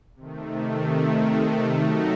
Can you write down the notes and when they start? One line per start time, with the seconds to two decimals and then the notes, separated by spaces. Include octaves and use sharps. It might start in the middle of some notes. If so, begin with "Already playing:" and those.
0.15 C3 D#3 A3
1.76 F#3 A3 D#4 F#4 A#4